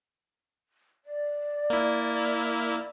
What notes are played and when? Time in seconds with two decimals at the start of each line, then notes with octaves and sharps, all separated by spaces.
1.05 D5
1.70 A#3 E4